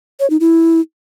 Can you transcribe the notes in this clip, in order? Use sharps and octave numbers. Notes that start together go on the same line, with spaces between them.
C#5
D#4
E4